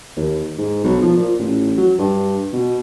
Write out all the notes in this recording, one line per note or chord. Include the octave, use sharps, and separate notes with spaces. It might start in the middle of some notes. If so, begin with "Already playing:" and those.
D#2
G#2
B1
F3
A#2
A1
F#3
G2
B2